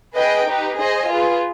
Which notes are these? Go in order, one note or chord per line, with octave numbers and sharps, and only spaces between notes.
G#4 B4 D#5 G5
D#4 G4 B4
G#4 C5 D#5 G#5
F4 G#4 B4